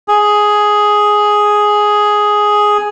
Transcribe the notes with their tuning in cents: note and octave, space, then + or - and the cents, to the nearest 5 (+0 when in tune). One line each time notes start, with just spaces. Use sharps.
G#4 +5